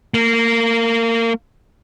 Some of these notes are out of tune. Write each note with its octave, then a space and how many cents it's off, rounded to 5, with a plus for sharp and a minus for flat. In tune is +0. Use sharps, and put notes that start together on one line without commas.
A#3 -25